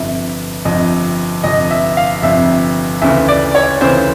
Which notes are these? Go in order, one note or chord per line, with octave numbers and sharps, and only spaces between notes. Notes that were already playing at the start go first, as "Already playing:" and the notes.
Already playing: G1 F2 C3 E5
G1 F2 C3 D#5
G1 F2 C3 D#5
E5
F5
G1 F2 C3 E5
D2 C#3 E3 E5
D5
C#5
D2 C#3 E3 C5